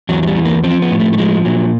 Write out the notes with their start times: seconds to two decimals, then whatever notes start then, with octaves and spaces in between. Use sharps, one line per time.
0.09 E2 F#3
0.23 F#3
0.27 G3
0.37 E3
0.45 A#3
0.64 F3 C4
0.82 B3
0.91 A2
1.00 A3
1.13 A3
1.18 F3 G#3
1.45 A#2 F#3